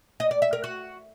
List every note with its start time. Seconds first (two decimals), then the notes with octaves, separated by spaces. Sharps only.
0.20 D#5
0.31 D5
0.42 E5
0.53 A#4
0.64 F#4